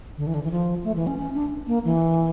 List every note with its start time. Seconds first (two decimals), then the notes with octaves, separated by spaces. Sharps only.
0.18 D3
0.27 E3
0.34 D3
0.44 E3
0.51 F3
0.84 A3
0.96 E3
1.07 C#4
1.18 C#4
1.34 D4
1.67 A#3
1.85 E3